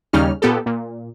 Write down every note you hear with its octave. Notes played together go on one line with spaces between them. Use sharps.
D#2 C#3 G3 C#4 D#4 F6
A#2 B3 G4 A4
A#2